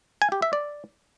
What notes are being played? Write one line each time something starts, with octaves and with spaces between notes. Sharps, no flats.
G#5
G4
E5
D5